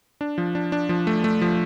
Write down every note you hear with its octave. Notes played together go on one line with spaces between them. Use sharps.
D4
F3
D4
D4
F3
A3
A3
F3